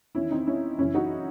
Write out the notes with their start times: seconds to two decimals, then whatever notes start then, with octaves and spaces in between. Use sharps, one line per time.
0.15 E2 D#3 C#4 E4
0.31 C4 D#4
0.47 C#4 E4
0.79 F#2 C#3 E3 C#4 E4
0.94 D#4 F#4